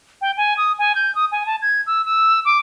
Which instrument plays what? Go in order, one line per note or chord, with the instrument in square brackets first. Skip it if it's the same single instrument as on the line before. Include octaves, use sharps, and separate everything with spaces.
[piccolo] G5
G#5
D#6
G#5
G6
D#6
G#5
A5
G#6
E6
E6
D6